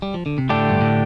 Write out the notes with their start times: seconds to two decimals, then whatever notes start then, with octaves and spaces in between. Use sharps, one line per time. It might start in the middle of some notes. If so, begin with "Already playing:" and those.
0.02 G3
0.14 F3
0.26 D3
0.38 C3
0.49 A2 D3 A3 D4 G4
0.70 G2
0.81 A2